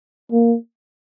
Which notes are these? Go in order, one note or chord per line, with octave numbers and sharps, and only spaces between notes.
A#3